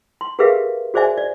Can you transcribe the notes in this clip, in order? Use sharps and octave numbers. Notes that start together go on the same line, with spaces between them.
C6
G4 G#4 A#4 B4 E5 F5
F#4 G#4 C5 D5 E5 G#5
D5